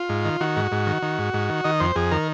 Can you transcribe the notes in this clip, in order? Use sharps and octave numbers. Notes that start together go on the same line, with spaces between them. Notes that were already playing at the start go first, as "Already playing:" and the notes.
Already playing: F4
G#2
D#3
D#3 F#4
G#2
G#2
D#3
D#3
G#2
G#2
D#3
D#3 D#5
F2 C5
F2 G#4
D#3 A#4